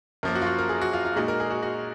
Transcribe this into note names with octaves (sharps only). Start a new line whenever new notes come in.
F#2 F3 A#3 A#4
F#4
F4
F#4
A#4
G#4
F#4
F4
F4
A#2 G#3 D#4 F#4
A#4
G#4
F#4
F#4